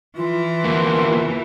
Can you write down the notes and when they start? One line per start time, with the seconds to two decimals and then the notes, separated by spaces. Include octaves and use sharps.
0.17 E3 F4
0.64 E2 A#3